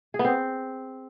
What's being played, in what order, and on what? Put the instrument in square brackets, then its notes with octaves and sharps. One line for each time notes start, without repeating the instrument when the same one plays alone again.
[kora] G#4
B3
C4